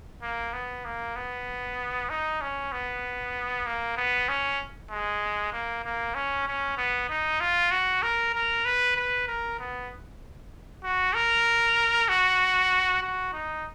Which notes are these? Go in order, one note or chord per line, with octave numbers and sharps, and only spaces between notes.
A#3
B3
A#3
B3
D#4
C#4
B3
A#3
B3
C#4
G#3
A#3
A#3
C#4
C#4
B3
D#4
F4
F#4
A#4
A#4
B4
B4
A#4
B3
F#4
A#4
F#4
F#4
D#4